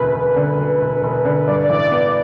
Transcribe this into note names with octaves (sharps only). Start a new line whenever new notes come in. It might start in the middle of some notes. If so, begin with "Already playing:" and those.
Already playing: E1 D2 B4
E1
D3
D2
E1
E1
D3
G2 D5
D5
A1
B3